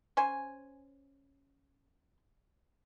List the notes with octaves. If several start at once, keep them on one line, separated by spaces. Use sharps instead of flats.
C#4 C5 G#5